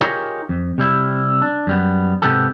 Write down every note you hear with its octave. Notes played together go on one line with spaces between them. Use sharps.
D#4 F4 G4 G#4 A#4 C#5
F2
C3 G3 E4
D4
F#2 G3 B3
G#2 C3 G#3 B3 G4 A4